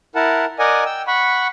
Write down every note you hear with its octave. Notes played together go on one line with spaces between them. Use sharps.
E4 A#4 F#5 A5
A#4 D5 D#5 F#5 G#5
G5 E6
F#5 B5 C#6